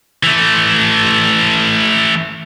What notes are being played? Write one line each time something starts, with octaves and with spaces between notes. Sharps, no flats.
E3 A3